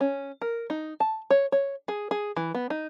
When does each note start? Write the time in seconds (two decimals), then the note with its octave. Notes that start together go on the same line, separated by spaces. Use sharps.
0.01 C#4
0.42 A#4
0.70 D#4
1.00 A5
1.31 C#5
1.52 C#5
1.88 G#4
2.11 G#4
2.37 E3
2.55 B3
2.70 D#4